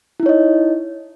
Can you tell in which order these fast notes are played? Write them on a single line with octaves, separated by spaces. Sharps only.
E4 D#4 C#5 D#5